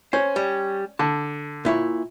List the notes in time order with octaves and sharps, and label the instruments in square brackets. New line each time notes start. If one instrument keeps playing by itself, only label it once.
[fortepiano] C#4 [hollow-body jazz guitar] C5
[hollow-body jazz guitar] G3
[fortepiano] D3 [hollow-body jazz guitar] A5
[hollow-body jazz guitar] A#2 E4 C#5